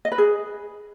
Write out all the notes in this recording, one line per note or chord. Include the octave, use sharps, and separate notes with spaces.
D#5
B4
G#4